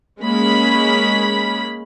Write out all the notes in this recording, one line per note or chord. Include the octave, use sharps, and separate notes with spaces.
G#3 A#3 C#4 B5